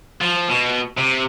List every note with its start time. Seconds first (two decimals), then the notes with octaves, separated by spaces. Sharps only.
0.21 F3
0.49 B2
0.98 C3